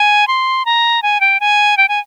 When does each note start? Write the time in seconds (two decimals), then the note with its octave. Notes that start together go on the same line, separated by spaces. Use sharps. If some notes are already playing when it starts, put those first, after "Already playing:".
Already playing: G#5
0.28 C6
0.65 A#5
1.03 G#5
1.21 G5
1.40 G#5
1.77 G5
1.89 G#5